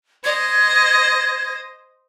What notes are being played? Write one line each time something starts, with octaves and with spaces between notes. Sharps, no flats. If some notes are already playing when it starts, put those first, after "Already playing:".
C5 D#5 G#6